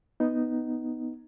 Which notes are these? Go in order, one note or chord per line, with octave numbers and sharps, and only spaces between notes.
B3 D#4